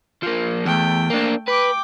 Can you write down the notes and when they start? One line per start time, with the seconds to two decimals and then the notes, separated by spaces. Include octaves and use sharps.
0.23 F3 A#3
0.66 E2 A3 G5
1.10 A#3 D4
1.48 B4 G5 D6